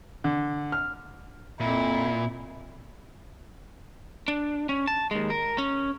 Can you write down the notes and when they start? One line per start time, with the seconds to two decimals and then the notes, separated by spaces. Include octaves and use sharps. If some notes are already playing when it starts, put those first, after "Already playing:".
0.24 D3
0.72 F6
1.60 F2 A#2 E4
4.28 D4
4.69 C#4
4.87 A5
5.11 D#2 G#3
5.30 A#4
5.58 C#4